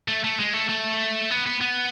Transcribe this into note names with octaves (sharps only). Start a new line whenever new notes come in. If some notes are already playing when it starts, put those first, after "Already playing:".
A3
A3
G#3
A3
A3
B3
B3
B3